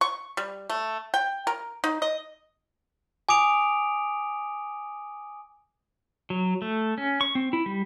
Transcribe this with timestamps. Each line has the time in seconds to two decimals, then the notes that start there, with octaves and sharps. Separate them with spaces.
0.01 C#6
0.37 G3
0.70 A3
1.14 G5
1.47 A#4
1.84 D#4
2.02 D#5
3.29 G#5 D6 D#6 D7 F7
6.30 F#3
6.62 A3
6.98 C#4
7.21 C#6
7.35 C4
7.53 E4
7.66 G3